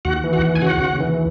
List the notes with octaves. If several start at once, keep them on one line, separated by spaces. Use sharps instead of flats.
D#2 F#4 F#5
E3
F#4 F#5
D#2
G#5
C#3 F#4 F#5
D#2
E3